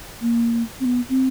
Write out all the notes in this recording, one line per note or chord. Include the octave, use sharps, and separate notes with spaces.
A#3
C4
B3
C4